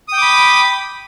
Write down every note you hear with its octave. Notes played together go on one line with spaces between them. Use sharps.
G5 B5 D6 D#6